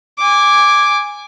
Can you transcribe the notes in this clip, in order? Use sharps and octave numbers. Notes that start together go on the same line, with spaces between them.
G#5 D6